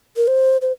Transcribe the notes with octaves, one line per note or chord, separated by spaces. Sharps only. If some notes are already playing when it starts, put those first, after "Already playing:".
A#4
C5
C5